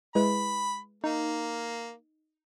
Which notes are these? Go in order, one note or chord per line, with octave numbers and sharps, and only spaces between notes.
G#3 E4 B4 B5
A#3 D#4